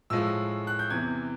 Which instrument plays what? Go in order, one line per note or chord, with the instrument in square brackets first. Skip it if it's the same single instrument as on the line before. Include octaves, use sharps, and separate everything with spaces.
[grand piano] A2 F3 G#3 E6
F#6
G6
E2 C3 E3 G#6